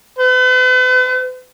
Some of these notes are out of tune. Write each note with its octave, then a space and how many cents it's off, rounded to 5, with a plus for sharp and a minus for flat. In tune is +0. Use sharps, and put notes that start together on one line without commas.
B4 +45